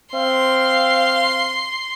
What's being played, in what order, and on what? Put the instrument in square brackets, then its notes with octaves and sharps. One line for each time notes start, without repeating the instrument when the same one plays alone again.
[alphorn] C4 [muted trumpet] F5 [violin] C6